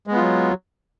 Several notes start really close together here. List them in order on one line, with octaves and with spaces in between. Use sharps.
G#3 B3 F4 F#3